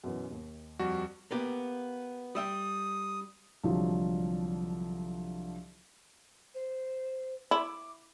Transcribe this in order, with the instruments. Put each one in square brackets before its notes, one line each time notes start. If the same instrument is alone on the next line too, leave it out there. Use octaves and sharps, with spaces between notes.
[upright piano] F#2 B2 E3
D#2
[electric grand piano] F2 G3 F#4
[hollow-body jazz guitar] A#3 B3 G4
[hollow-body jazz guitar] G3 E5 G5 [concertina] D#6
[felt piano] C2 D3 F3 F#3
[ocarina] C5
[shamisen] E4 [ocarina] D6